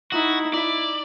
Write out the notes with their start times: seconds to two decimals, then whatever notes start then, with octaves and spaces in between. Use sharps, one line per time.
0.12 D#4 E4 F#4
0.54 E4 D5